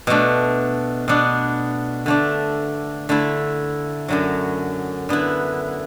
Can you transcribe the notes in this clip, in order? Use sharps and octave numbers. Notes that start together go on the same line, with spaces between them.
B2 A3 D4
B2 B3 D4
D3 A3 D4
D3 A3 E4
F#2 D3 F#3
D3 B3 E4